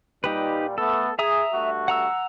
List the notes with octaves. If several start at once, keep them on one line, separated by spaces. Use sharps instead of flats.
A#2 G3 D#4 G4 B4
A3 B3 A4
G#4 E5 A#5 D#6
G2 A3 F#4
F#5 A#5 E6